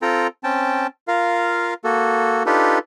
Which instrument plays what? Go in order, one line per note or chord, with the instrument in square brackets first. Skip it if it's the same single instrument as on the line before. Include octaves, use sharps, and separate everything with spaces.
[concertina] C4 F4 A4 G5 A#5
C4 C#4 G5 A5
F4 A#4 F5
A#3 F#4 A4
D4 D#4 F4 G4 A4 B4